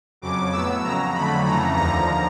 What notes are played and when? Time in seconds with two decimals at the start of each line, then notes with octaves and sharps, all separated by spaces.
0.22 F2 C#3 F#3 D6
0.52 A2 F#3 B3 E6
0.84 F2 C#3 F#3 A#5
1.14 F2 D3 F#3 A3 B5
1.45 F2 C#3 E3 A3 A#5
1.75 D#2 D3 F3 A#5